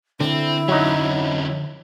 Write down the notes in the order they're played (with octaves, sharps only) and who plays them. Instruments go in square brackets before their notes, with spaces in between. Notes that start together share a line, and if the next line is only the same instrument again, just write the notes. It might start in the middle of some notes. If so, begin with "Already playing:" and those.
[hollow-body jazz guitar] D3 [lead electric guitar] C4 [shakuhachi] E4
[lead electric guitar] F2 C#4 [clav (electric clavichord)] F#3 D#4